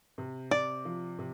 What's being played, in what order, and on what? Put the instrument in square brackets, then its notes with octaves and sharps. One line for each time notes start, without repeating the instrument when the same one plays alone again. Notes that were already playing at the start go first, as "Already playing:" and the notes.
[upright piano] C3
[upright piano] C3 [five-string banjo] D5
[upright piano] F3
C3